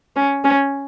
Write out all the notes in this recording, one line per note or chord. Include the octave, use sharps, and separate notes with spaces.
C#4
C#4